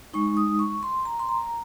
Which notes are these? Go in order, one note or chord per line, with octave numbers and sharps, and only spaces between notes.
G#3 D#4 C#6
D#6
C#6
C6
A#5
C6
A#5